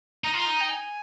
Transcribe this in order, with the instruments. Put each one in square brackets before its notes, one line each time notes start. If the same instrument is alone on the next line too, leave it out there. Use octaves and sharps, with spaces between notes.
[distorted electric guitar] D#4 [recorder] A#5
[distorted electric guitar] F4 [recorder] A#5
[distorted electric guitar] D#4
[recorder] G5
G#5